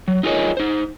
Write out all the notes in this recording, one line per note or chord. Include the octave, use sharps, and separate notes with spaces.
F#3
D#4 F4 G#4 A#4 C#5 D#5
D#4 C5